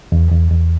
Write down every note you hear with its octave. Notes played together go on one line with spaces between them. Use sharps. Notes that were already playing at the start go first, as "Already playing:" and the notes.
E2
E2
E2